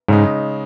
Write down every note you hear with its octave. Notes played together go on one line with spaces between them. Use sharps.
G#2 C#3 G#3 D#4